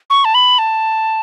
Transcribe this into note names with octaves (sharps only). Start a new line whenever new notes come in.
C#6
A5
B5
A5